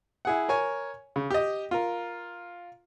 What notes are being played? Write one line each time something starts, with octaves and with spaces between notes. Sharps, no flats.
E4 G#4 F#5
A#4 C#5 G#5
C#3
G4 D#5
F4 A#4